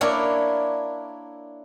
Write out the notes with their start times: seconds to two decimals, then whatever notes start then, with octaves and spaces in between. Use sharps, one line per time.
0.01 A#3 D4 E4 A#4 C#5